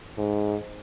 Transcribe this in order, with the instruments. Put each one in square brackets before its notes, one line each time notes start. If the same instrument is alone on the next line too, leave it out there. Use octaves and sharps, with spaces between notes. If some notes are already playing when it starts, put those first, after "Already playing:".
[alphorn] G#2